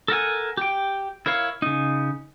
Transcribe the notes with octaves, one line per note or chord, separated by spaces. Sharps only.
A4 A#4 F#5 G#5
G4 G5
E4 A#4 C#5 F5
C#3 D#4